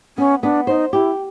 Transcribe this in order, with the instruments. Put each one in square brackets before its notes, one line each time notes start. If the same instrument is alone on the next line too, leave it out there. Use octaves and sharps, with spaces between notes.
[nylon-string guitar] B3 [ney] C#4
[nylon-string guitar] B3 [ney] D4
[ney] D#4 [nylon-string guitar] C5
[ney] E4 [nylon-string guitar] G4